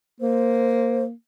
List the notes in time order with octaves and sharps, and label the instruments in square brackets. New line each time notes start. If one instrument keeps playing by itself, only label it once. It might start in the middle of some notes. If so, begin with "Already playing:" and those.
[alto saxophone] A#3 [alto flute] C5